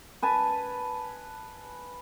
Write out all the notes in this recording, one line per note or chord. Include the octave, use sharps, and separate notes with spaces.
B4 G#5 A5